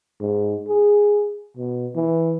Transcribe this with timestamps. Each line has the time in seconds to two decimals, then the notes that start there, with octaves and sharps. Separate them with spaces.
0.21 G#2
0.68 G#4
1.57 B2
1.95 E3